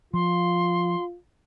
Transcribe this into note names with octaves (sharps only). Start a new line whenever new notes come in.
F3 F4 C6